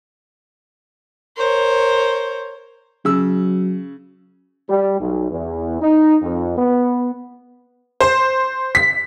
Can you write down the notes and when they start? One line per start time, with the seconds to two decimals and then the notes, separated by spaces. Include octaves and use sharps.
1.37 A#4 C5 C#5
3.05 C#3 F#3 E6
4.69 G3
5.00 B1
5.30 E2
5.81 D#4
6.22 F2
6.58 B3
8.00 C5
8.75 B6